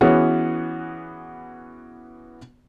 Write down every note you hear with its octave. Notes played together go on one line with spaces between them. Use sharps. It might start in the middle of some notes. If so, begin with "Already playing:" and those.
E3 B3 C#4 F#4 G#4